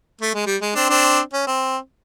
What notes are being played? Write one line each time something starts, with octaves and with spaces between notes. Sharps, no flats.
A3
G#3
G3
G#3
C4 D4
C4 D4
C#4
C4